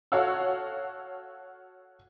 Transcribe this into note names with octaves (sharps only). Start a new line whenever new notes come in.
F#4 A4 C#5 F5 F#5 E6